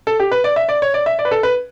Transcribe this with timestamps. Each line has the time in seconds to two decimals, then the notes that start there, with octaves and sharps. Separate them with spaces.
0.07 A4
0.20 G4
0.31 B4
0.44 D5
0.56 E5
0.69 D5
0.82 C#5
0.94 D5
1.06 E5
1.19 D5
1.25 B4
1.31 A4
1.43 B4